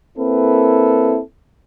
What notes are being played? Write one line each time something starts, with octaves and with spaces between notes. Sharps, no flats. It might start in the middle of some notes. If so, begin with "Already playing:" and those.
A#3 C4 E4 A4 B4